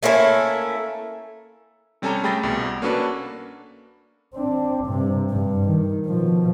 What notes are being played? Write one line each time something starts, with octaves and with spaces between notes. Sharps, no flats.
A3 A#3 C#4 E4
C3 G3 C#4 A4 G#5 A#5
A3 G#4 G5 B5 A6 A#6
C2 B2
A#3 C#4 D4 F#4 A4 B4
C4 D4
G2 C3
G2
D#3
B2 F3